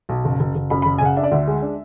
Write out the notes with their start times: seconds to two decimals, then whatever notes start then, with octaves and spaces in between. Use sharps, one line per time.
0.09 B1
0.25 F#1
0.40 F#1
0.55 F#1
0.70 F#2 B5
0.82 B5
0.86 F#1
0.98 G#5
1.01 C#3 F#5
1.17 D4 E5
1.24 D5
1.31 D2 E5
1.48 G#3
1.62 D4